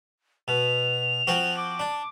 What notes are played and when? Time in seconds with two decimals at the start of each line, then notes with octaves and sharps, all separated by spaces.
0.48 B2 F7
1.27 F3 C4 F#4
1.57 D6
1.80 D4